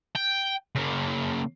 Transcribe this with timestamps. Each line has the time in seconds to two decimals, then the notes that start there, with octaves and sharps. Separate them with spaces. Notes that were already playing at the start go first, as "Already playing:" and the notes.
0.15 G5
0.75 C#3 A#3